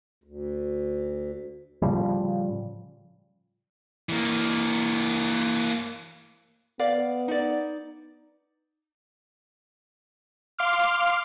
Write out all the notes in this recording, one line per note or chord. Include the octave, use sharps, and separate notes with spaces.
D2
A2 C#3 F3 G3
E3 A#3
B3 D5 F5
D#4 D5
F5 C6 D6 F6